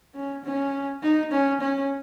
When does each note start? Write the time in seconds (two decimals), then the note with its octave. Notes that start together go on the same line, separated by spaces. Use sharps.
0.15 C#4
0.45 C#4
1.03 D#4
1.32 C#4
1.61 C#4